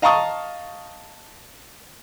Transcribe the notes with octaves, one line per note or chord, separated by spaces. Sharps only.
D#5 F5 A5 A#5 C#6 D#6